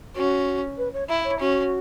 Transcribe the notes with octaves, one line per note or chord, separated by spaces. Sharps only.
C#4 F#4
B4
C#5
E4 E5
C#5
C#4 F#4